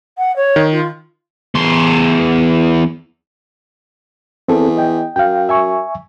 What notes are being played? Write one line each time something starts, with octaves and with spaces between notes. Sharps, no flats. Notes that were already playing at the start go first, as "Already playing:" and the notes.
F#5
C#5
D#3
F4
E2 C6
E2 C4 A4
D#5 G5
F#2 F5 G5
E5 G#5 C#6